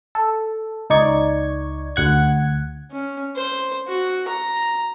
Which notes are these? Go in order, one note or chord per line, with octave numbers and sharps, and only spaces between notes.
A4
C#2 D#4 D5 C#6 G#6
D2 F#5 G#6
C#4
C5
F#4
A#5